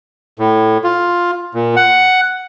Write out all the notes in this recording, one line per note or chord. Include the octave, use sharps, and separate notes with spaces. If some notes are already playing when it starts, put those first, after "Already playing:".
A2
F4
A#2
F#5